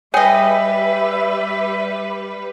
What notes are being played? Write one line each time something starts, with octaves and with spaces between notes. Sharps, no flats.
G3 G#4 B4 C#5 D#5 E5 G5